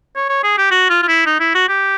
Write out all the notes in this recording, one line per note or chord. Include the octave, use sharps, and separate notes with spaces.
C#5
C#5
G#4
G4
F#4
F4
F4
E4
D#4
E4
F#4
G4